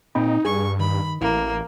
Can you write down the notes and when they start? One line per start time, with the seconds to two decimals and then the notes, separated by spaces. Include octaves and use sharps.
0.15 A#2 C4 D#4 B5
0.45 G2 G#4 C#6
0.79 D#3 B5
1.21 A1 A#3 E4